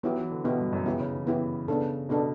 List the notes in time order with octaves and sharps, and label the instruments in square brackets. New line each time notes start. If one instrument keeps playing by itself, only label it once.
[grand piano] F#3 [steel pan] B3 E4 G4
[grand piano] E3
D3
[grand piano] B2 [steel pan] B3 E4 G4
[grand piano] G2
F#2
[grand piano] C#3 [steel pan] B3 E4 G4
[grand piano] C#3
E3
[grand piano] E3 [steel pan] B3 E4 G4
[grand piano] C#3 [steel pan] B3 D4 A4
[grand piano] B2 [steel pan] B3 D4 A4